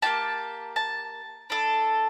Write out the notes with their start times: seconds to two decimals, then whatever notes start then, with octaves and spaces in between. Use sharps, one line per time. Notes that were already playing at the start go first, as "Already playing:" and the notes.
0.02 A#3 D#4 G4 A5
0.76 A5
1.50 D4 A4